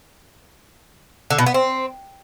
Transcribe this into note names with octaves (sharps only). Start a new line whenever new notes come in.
D3
B2
B3
C4